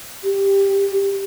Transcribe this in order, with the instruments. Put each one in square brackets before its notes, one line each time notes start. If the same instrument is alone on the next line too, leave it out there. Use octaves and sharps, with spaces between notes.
[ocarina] G4